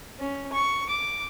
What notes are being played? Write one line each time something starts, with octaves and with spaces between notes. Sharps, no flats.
C#4
C#6
D6